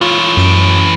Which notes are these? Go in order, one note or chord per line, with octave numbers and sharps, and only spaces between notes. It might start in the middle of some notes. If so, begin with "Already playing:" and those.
E3 F4 C#5
F#2 D7